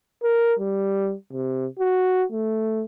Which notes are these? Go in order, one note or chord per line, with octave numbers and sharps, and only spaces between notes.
A#4
G3
C3
F#4
A3